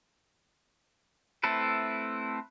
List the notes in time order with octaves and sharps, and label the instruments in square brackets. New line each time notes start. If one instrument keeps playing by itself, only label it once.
[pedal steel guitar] A3 C4 E4 A4 B4